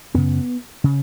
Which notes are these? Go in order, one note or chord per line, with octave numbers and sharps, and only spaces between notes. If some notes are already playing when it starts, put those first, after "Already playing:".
F#2 C#3 B3
C#3